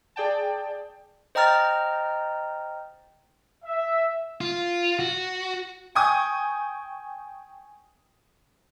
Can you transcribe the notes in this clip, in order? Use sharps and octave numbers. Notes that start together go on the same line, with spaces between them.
G#4 D5 G5 A5
C5 D#5 G5 A#5 F6 A6
E5
F4
F#4
G5 G#5 C#6 D#6